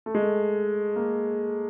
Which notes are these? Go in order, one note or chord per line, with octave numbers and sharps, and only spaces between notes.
A3
G#3
A3
A#3